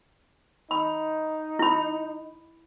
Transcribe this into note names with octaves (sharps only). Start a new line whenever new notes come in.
D#4 B5
E4 B5